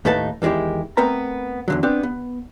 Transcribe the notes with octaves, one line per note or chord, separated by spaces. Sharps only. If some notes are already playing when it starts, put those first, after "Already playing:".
D#2 A2 A3 D#4 B4 A5
E2 D#3 G#3 E4 G4
A3 B3 C4 A#4 B4 A#5
E2 D3 F#3
B3 C4 D4 G4
B3